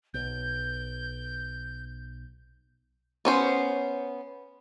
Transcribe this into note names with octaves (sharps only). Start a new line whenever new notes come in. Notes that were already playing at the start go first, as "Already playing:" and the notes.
B1 G6
B3 C#4 C5